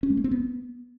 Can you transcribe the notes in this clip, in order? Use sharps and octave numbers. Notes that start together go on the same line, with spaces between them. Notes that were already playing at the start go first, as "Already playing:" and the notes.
C#4
G#3
A#3
C4
B3